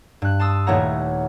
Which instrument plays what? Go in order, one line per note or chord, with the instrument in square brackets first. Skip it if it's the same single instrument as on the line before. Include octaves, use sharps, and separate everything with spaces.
[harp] G2 F#6
A5 C6 D#6 E6
D#1 A3 E4 C#5 F#5 A#5